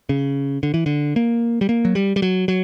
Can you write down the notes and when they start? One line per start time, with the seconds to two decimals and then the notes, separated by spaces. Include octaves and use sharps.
0.09 C#3
0.63 D3
0.74 E3
0.86 D3
1.16 A#3
1.61 G3
1.69 A#3
1.85 F#3
1.95 G3
2.16 G3
2.22 F#3
2.48 F#3